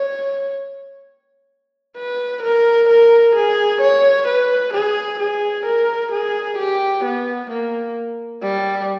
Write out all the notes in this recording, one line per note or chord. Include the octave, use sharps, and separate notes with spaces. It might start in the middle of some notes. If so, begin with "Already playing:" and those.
Already playing: C#5
B4
A#4
A#4
G#4
C#5
B4
G#4
G#4
A#4
G#4
G4
B3
A#3
G3